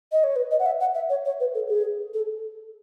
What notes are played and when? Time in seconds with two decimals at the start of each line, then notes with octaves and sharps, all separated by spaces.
0.12 D#5
0.24 C#5
0.36 B4
0.51 D#5
0.60 F#5
0.66 E5
0.80 F#5
0.95 E5
1.10 C#5
1.25 C#5
1.40 B4
1.55 A4
1.69 G#4
2.14 A4